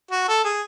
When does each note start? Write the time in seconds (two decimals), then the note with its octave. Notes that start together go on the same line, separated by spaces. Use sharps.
0.11 F#4
0.28 A4
0.45 G#4